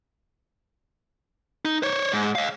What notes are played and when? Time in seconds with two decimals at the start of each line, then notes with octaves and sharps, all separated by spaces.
1.65 D#4
1.83 C5 C#5
2.13 G#2
2.35 D#5 F5